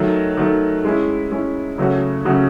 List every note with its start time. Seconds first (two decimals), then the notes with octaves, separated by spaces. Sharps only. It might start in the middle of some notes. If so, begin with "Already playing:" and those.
Already playing: D#3 F#3 A3
0.37 D#3 F#3 A3
0.85 G#3 C#4 E4
1.31 G#3 C#4 E4
1.78 C#3 F#3 A3 C#4 F#4
2.25 C#3 F#3 A3 C#4 F#4